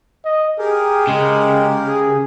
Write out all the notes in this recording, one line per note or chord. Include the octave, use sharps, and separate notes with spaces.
D#5
G4 G#4 A#4
C#3 G#3
G#4